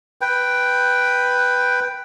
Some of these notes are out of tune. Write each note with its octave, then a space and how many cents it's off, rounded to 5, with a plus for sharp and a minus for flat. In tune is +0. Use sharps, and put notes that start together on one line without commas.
B4 +0 G5 +0